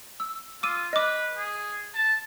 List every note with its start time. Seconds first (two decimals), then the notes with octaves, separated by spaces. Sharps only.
0.20 E6
0.63 F4 D6 E6 D#7
0.93 B4 D#5 D6
1.37 G#4
1.95 A5